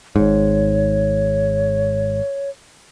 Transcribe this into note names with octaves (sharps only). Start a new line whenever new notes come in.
G#1 G#2 C#5